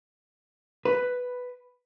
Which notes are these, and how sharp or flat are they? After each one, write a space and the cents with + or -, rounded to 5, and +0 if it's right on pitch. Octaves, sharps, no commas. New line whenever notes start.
B4 +5